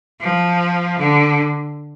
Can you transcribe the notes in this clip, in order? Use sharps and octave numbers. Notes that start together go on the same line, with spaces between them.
F3
D3